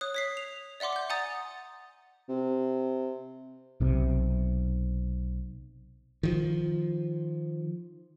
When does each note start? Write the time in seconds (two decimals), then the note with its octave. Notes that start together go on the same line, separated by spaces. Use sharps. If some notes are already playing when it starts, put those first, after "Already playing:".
0.01 C#5 D#6 F#6
0.14 C#5 B6 C7
0.37 F7
0.80 D5 E5 F#5 C6 D6
0.93 F#5 G6
1.10 F#5 G#5 A#5 D#6 A6
2.29 C3
3.80 B1 C3
6.23 D#3 F3